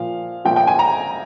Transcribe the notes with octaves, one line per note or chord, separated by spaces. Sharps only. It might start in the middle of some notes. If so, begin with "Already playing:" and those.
Already playing: A#2 F3 F5
A#2 F3 G5
G5
G#5
A#5